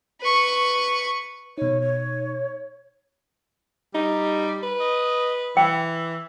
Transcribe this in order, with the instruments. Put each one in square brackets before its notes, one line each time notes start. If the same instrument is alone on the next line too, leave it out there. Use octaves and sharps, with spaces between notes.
[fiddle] B4 C#6
[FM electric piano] B2 D#4 [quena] C#5
[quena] C#5
[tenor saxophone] G3 [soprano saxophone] D#4
[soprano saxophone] B4
[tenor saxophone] D#5
[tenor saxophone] E3 [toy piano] G5